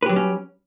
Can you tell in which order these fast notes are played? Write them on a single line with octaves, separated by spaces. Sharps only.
B4 G4 F#3 G3 C#4